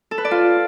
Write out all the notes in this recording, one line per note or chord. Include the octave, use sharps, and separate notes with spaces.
A4
B4
D5
F4